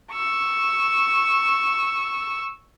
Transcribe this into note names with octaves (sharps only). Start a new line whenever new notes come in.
C#6 E6